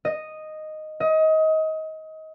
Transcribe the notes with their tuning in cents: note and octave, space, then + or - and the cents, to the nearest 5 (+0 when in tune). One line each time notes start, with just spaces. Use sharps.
D#5 -5
D#5 +25